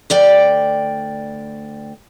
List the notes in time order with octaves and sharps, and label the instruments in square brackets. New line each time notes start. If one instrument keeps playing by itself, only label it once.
[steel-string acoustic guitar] D2 D5 G5